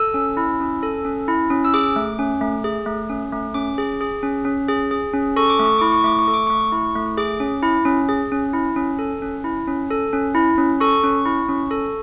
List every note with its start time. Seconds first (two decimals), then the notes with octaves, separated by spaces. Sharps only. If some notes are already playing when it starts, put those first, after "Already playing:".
Already playing: A4 E6
0.14 C#4
0.37 E4
0.60 C#4
0.83 A4
1.05 C#4
1.28 E4
1.50 C#4
1.65 E6
1.74 G#4 D6
1.96 A3
2.19 C#4
2.41 A3
2.64 G#4
2.86 A3
3.09 C#4
3.32 A3
3.54 C#4 D6
3.78 G#4
4.01 G#4
4.23 C#4
4.45 C#4
4.69 G#4
4.91 G#4
5.14 C#4
5.36 A4 C#6
5.50 D6
5.59 A3 C#6
5.78 E4 D6
5.92 C#6
6.04 A3 D6
6.19 C#6
6.28 A4
6.34 D6
6.47 A3 C#6
6.72 E4
6.95 A3
7.18 G#4 D6
7.40 C#4
7.62 E4
7.85 C#4
8.09 G#4
8.32 C#4
8.53 E4
8.76 C#4
8.99 A4
9.22 C#4
9.44 E4
9.67 C#4
9.90 A4
10.13 C#4
10.35 E4
10.58 C#4
10.80 A4 C#6
11.04 C#4
11.25 E4
11.49 C#4
11.71 A4